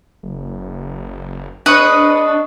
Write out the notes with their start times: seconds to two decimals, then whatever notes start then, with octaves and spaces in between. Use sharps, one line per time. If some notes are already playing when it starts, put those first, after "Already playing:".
0.23 F#1
1.66 G#3 C4 D4 B4 D#5 C#6 D#6 F#6